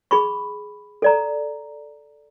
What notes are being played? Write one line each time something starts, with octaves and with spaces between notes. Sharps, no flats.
G#4 B5 C#6
A4 D5 A#5